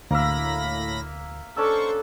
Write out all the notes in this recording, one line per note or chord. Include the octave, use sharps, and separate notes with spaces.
D2 A2 A#3 A#4 E5 B5 A#6
C#4 D4 A4 C5 C#6 E6